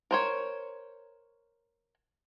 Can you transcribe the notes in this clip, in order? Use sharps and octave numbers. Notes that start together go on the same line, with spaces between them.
A#4 C5 C#5